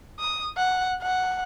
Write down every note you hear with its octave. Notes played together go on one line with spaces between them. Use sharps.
D#6
F#5
F#5